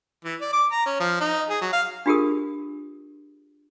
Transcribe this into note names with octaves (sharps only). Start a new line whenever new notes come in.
E3
D5
D6
A#5
C#4
F3
D#4
G#4
F#3
F5
D4 F4 G4 G#4 A#4 D#6